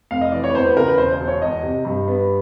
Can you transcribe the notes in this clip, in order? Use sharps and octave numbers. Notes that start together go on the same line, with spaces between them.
F1 F5
D#5
E3 D5
C#5
B4
E2 C5
B4
C#3 A#4
B4
E1 C5
C5
E1
C#5
E2 D#5
C3
G2
B3